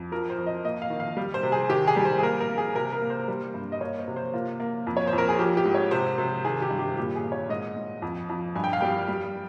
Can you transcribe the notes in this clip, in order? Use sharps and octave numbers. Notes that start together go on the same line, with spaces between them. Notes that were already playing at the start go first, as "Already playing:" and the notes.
Already playing: F2
F3 A#4
C5
F2
D#5
A#3 D#5
F5
D#3
F5
G3
C5
C3
G#4
D#3 G4
G#4
G3
C5
G#4
A#3 A#4
A#4
A#3
G#4
C3 A#4
A#4
A#3
C5
G3
G2
D#5
A#3 C#5
C5
C3
C5
A#3 F4
A#3
F2
C#5
C5
F2
A#4
G#4
F3 G4
G4
G#2
C#5
C3 C5
C3
D#3 G#4
G4
G2
G4
A#2 G4
G#4
A#2
C#5
G#2 D#5
G#2
F2
F2
G2 G#5
G5
F5
G3 G5
G3